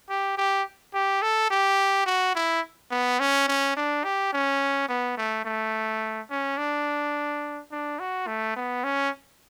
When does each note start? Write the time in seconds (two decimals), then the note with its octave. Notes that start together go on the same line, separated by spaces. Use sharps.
0.09 G4
0.37 G4
0.94 G4
1.22 A4
1.51 G4
2.06 F#4
2.35 E4
2.91 B3
3.20 C#4
3.48 C#4
3.77 D4
4.04 G4
4.33 C#4
4.88 B3
5.17 A3
5.45 A3
6.30 C#4
6.58 D4
7.72 D4
8.00 F#4
8.27 A3
8.56 B3
8.84 C#4